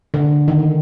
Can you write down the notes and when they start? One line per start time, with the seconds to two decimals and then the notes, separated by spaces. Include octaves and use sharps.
0.14 D3
0.48 D#3